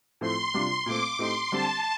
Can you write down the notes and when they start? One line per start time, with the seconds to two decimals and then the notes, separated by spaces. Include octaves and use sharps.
0.21 A2 F3 A3 C4 C6
0.54 C3 G3 D4 F4
0.86 A#2 A3 C4 D6
1.19 A2 A3 C4 D#4 G4 C6
1.52 D3 G3 C4 G4 A5